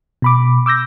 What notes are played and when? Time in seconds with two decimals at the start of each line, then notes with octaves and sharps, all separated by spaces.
0.22 B2 B5 D6
0.66 D6 E6 G6 A#6